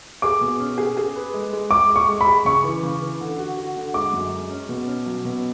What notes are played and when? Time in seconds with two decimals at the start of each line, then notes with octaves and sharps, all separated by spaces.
0.22 G#4 D6
0.41 B2
0.60 C#4
0.78 G#4
0.97 G#4
1.15 B4
1.34 G#3
1.53 G#3
1.71 G#3 D6
1.90 G#3
1.96 C#6
2.08 G#3
2.21 B5
2.27 G#4
2.45 C#3 C#6
2.64 E3
2.83 C#3
3.02 E3
3.20 D3
3.38 F#4
3.57 F#4
3.76 D3
3.94 G#3 D6
4.13 F#2
4.32 G#3
4.50 C#4
4.69 B2
4.87 C#4
5.06 F#3
5.25 B2